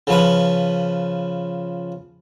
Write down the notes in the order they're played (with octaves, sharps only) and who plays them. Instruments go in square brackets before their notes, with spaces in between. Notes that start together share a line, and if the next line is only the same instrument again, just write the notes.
[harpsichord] C#3 F3 B4